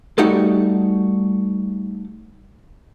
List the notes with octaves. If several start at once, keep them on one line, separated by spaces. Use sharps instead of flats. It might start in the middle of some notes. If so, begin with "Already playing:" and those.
G3 A3 D#4 F#4 G4 A4